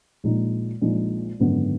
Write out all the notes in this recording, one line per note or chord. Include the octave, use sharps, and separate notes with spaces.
A#1 A#2 G#3 D#4
A#1 A#2 G#3 D#4
G#1 F#2 D3 G#3 B3